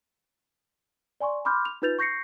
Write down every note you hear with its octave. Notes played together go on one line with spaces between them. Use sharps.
D5 G#5 C6 C#6
B5 C6 D6 F6 G6
F7
D#4 F4 B4 G6 A6 F7
C#6 G6 A#6 C7 C#7